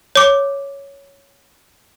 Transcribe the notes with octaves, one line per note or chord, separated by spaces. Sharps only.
C#5 D6